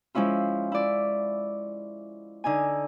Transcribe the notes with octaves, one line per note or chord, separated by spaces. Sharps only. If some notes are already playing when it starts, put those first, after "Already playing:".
F3 G#3 C#4 E4 F4
E4 D5
D3 D#4 G#5